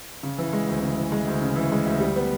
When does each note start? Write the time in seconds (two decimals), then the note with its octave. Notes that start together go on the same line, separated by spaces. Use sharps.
0.23 C#3
0.38 E3
0.53 G#3
0.68 D2
0.82 C#3
0.97 E3
1.12 G#3
1.27 D2
1.42 C#3
1.56 E3
1.72 G#3
1.86 D2
2.00 G3
2.16 B3